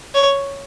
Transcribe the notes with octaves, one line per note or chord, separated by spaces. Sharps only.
C#5